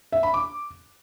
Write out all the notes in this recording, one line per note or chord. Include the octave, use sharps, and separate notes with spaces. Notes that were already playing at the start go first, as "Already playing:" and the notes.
E5
B5
D6